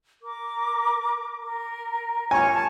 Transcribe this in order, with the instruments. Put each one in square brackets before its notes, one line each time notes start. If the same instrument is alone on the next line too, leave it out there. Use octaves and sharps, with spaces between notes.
[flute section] A#4 D6
A#4
[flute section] F4 G4 C#5 [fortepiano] G#5 C#6
[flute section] A5